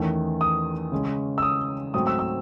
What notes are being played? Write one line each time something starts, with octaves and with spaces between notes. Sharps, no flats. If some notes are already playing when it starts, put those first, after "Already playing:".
Already playing: E2 D#3 A3 C#4
D#6
C#3 G#3 C#4
E6
D#6
G#2 F#3 A3 C4 D#6
E6
E6